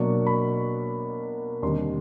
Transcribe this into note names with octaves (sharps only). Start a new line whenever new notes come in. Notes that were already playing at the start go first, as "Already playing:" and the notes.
Already playing: B2 F#3 A#3 D4 C#6
B5
D#2 D3 G3 C4 C6